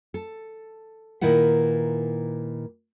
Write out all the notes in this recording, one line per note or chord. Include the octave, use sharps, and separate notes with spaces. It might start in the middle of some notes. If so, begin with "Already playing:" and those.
A4
A#2 D#3 E4 B4 F#5